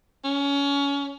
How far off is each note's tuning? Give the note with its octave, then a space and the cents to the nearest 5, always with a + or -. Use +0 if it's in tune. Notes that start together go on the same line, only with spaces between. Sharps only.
C#4 +25